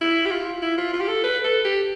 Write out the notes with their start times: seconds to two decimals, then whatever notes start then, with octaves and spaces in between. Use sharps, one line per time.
0.01 E4
0.25 G4
0.31 F4
0.62 E4
0.78 F4
0.93 F4
1.01 G4
1.08 A4
1.24 B4
1.44 A4
1.65 G4